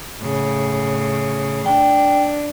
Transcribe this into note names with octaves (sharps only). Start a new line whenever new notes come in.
A2 C#3
D4 G5